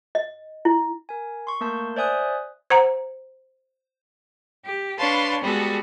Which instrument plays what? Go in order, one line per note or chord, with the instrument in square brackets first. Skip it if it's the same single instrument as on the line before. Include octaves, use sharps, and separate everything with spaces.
[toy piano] D#5
E4
[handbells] A#4 G#5
C6 C#6
A3 A#3 A#4 A5 C6 G6
C5 D5 E5 G#5 D#6 F#6
[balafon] C5 F#5 A#5
[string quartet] G4
D4 B4 C#5 F5 A5 C6
G3 G#3 B3 F#4 G#4 A4